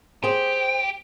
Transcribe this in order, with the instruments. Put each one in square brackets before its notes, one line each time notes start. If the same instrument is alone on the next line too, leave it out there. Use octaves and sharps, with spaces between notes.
[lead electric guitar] G4 [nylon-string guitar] G#4 C5